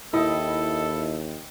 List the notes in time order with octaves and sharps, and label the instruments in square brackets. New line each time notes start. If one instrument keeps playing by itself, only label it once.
[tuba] D#2 [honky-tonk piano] E4 [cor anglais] A4 [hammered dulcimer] D#5 G5